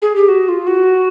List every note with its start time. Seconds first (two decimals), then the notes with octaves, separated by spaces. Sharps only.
0.02 G#4
0.16 G4
0.29 F#4
0.49 F4
0.67 F#4